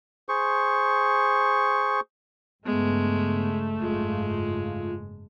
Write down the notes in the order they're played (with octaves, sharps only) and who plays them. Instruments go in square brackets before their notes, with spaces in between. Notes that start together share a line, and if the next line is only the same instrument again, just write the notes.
[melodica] G#4 C5 C#6
[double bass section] G2 C#3 [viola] G#3 [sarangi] A3 [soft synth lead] B3
[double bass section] F#1 G#2 [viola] G#3 [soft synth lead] F4